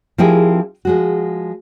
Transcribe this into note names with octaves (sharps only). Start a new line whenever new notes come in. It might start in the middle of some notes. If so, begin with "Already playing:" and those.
F3 C4 E4 G4 G#4 A#4
F3 G#3 F#4